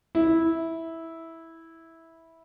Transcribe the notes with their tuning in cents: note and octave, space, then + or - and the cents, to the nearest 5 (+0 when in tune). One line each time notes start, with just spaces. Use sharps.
E4 -10